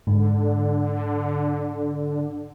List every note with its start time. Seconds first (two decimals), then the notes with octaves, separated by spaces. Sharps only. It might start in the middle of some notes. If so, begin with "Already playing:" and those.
0.07 G#2 D3